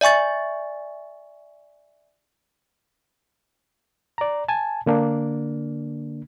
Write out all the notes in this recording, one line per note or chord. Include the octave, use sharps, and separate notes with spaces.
D5 E5 G#5 C#6 A6
D5 A#5
G#5 A5
D3 A#3 D4